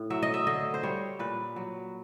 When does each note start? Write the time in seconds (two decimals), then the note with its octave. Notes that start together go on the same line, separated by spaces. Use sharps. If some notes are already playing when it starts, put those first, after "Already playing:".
Already playing: A2
0.10 F#3 E5
0.23 D#5
0.34 E5
0.47 D3 D#5
0.74 C5
0.83 G3 C#5
1.19 A#2 B4
1.56 F#3